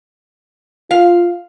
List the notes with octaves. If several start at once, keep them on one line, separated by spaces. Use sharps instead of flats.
F4 F5